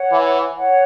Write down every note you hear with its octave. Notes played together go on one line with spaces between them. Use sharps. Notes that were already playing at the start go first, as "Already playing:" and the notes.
Already playing: C#5 F#5
E3
C#5 F#5